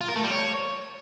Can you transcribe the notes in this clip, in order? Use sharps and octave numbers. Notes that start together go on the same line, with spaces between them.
F4
A#4
A3
G3
C#5